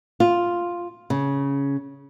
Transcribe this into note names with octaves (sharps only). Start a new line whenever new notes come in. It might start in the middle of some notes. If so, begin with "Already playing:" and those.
F4
C#3